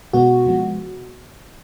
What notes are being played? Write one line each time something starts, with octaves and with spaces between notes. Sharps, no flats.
B2 G#3 B3 F#4
C3 F3 G#3 B3